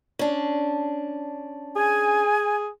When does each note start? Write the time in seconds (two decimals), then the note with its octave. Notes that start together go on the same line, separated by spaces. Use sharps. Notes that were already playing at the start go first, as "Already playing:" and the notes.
0.19 C#4 D4
1.76 G#4 G#5